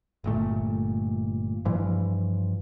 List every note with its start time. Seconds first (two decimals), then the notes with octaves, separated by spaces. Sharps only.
0.24 G1 A#2 A3
1.65 G2 E3 F3